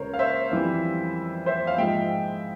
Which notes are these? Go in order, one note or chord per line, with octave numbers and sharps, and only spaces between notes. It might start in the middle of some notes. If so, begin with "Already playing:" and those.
Already playing: C#2 C#3 A#4 C5 C#5
F5
C5 E5
F2 E3 G3
C5 E5
F5
G#2 F3 G#3 E5 G5